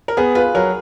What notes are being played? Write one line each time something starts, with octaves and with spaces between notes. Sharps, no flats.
A#4
B3 G#4
F4 B4
F#3 A#4